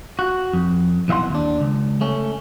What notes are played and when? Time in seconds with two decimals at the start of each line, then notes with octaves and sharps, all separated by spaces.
0.19 F#4
0.53 F2
1.08 B1 E3 E5 F#5 C6
1.30 D#2 D4
1.61 C#2
2.01 A3 C#4